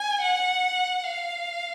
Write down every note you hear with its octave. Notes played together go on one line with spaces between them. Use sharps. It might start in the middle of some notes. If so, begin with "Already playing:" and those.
Already playing: G#5
F#5
F5